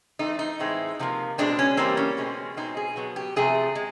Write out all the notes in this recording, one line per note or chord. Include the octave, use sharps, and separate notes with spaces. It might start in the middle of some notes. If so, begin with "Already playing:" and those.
E3 A3 C4 D#4
D#4
A2 E3 G#3 C4
C3 F3 A#3
B2 G#3 C4 D4
C#4
E3 G3 A#3 C4
C#4
B2 G#3 C4
B2 G#3 C4 D#4
G#4
B2 F#3 B3
G4
C3 F3 A3 C4 G#4
G#3